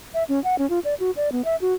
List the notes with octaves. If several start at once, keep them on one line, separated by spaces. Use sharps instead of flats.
E5
C#4
F#5
C#4
F4
D5
F#4
D5
B3
E5
F#4